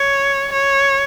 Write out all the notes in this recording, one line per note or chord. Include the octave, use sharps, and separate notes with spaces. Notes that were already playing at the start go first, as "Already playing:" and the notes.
Already playing: C#5
C#5